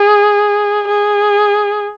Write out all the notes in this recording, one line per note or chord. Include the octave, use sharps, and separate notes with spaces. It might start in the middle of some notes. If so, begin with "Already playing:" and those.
Already playing: G#4
G#4